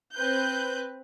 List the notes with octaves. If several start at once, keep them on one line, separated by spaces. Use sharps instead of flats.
C4 B4 F#6 G6